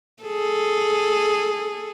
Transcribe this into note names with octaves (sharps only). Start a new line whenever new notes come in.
G#4 A4